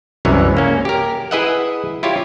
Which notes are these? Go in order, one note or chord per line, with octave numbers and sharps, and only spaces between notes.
C2 F#2 C3 E3 G#3 C#5
A#3 C#4
G4 A#4
E4 G#4 B4 D#5 E5 F#5
E4 F4 G4 C#5